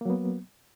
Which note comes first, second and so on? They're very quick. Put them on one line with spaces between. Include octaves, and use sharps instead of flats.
A#3 F#3 B3